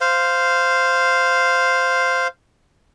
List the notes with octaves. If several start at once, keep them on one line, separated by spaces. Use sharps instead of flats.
C5 F5